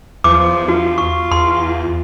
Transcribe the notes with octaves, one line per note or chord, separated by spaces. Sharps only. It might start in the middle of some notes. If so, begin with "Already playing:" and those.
E2 F3 D6
F4 F#4
C#6
E2 C6